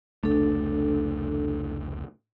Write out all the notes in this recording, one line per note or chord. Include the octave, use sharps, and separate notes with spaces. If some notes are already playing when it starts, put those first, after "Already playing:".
F1 C#2 A3 D4 A4